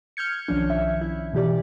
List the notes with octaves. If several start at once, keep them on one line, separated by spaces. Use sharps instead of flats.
F6 G6 G#6 C#7
B1 D#3 F3 C#4 D4
E5
E4
B2 E3 G4 D5